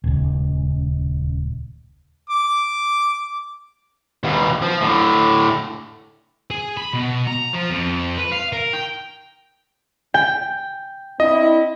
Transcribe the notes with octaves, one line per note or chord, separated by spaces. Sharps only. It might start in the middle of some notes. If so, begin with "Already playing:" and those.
D#1 C#2
D6
D#2 B2
F3
A2 D3
G#4
B5
B2
A#5
F3
F2
B4
F5
A#4
G5
G5
C4 D4 E4 D#5